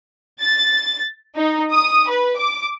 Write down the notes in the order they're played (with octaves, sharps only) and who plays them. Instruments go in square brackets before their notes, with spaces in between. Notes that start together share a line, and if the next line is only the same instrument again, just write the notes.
[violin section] A6
D#4
D#6
B4
D6